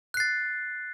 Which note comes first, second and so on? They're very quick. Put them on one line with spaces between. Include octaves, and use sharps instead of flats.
F#6 C7 A6